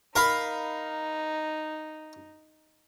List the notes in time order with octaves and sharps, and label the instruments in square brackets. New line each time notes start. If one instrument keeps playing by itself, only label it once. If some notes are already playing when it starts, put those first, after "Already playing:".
[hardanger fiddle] D#4 [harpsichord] A#4 F5 B5